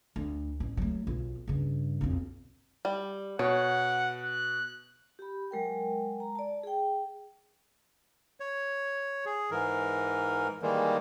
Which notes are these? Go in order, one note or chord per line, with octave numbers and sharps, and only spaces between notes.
D2
A1
F#3 A3
B1 F4
G2 C#3
B1 F2
G3
B2 C#5 F#5
F#6
G4 B5
F#3 G#3 A#4 G5
A#5
D5 A5
G#4 G5
C#5
G#4
G#2 E3 A#4
D#3 E3 G3 G#3 A#3